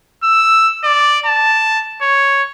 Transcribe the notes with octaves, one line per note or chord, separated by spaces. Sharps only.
E6
D5
A5
C#5